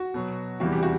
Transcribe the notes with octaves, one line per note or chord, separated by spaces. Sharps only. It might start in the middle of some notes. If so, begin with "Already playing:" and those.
Already playing: F#4
B2 F#3
E2 C3 E3 G3 F#4
G4
F#4